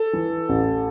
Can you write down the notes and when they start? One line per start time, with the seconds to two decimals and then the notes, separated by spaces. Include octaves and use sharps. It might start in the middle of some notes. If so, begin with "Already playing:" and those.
Already playing: A4
0.13 E3
0.49 A1